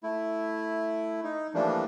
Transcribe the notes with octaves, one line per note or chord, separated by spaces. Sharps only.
A3 E4
D#4
E3 F3 G3 A3 A#3 D4